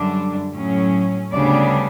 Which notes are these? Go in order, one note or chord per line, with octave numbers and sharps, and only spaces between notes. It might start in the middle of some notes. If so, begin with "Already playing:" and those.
Already playing: F#2 D3 G3 D4
A2 F#3 C#4
D2 C#3 G3 B3 D4 D5